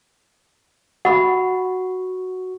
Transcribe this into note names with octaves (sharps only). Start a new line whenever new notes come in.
F#4 F#5 B5